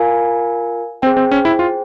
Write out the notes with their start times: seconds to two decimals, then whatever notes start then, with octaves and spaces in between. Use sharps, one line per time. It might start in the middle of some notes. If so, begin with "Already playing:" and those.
Already playing: F4 A#4 F5 G#5
1.02 C4 G#4 C5 G5
1.17 C4
1.31 C#4
1.45 E4
1.59 F4